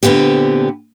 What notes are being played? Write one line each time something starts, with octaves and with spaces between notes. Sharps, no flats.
A#2 D3 B3 C4 G4